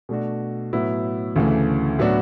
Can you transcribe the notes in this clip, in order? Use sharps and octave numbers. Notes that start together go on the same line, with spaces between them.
B2 A3 D4 F#4
A2 F#3 B3 E4
D2 C#3 E3 A3
A2 F#3 B3 D4 F#4